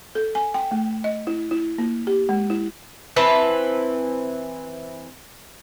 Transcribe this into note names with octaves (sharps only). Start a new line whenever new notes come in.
A4
G#5
G5
A3
D#5
E4
E4
A#3
G4
G#3
E4
E3 C4 B4 A5